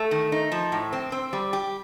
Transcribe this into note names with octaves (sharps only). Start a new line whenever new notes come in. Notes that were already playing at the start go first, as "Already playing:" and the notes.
Already playing: A3
D#3
D#4
F3
A2
C4
C4
G3
G4